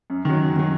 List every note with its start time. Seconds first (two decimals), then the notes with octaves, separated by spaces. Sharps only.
0.10 F#2
0.25 D#3 F#3
0.40 F#2
0.56 D#3 F#3